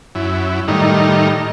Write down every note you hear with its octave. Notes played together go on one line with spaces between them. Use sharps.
F#2 E4
A2 D#3 G3 D#4